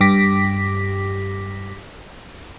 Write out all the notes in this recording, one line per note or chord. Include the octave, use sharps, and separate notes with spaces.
G2 G4 D6 A#6 B6